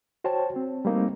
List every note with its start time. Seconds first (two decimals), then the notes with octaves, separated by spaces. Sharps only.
0.24 F#4 C5 C#5 G5 A5
0.56 C4
0.85 G3 A3 A#3 C4 D#4